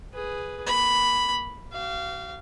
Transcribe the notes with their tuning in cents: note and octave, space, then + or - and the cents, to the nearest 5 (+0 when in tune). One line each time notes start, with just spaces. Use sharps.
G#4 -5 B4 +0
A#3 +10 B5 +0
F#4 +40 F5 -20